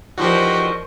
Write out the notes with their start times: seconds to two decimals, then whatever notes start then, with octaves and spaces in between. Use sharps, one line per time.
0.18 E2 F3 D#4 F#4 G4 A#4 C5 C#6